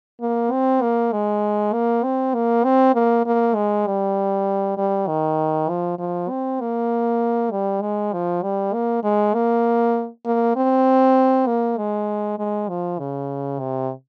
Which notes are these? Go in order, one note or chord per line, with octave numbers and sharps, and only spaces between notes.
A#3
C4
A#3
G#3
A#3
C4
A#3
C4
A#3
A#3
G#3
G3
G3
D#3
F3
F3
C4
A#3
G3
G#3
F3
G3
A#3
G#3
A#3
A#3
C4
A#3
G#3
G#3
F3
C#3
C3